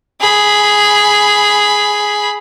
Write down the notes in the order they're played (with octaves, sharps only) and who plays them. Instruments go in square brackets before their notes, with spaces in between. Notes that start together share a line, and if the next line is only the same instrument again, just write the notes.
[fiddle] G#4 B5